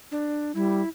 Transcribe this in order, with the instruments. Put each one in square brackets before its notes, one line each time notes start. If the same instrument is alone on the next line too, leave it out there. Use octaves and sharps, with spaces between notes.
[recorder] D4
[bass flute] G3 [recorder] E4